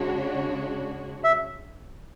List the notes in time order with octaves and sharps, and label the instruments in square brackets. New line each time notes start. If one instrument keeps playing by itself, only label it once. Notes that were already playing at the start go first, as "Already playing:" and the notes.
Already playing: [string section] C#3 G#3 D4 F#4 C#5
[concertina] E5